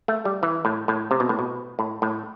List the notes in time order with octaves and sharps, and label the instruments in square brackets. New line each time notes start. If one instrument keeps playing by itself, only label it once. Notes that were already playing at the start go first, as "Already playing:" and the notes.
[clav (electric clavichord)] A3
G3
E3
A2
A2
C3
B2
A2
B2
A2
A2